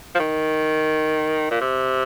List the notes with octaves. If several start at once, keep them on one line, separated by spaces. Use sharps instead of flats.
F3
D#3
A#2
C3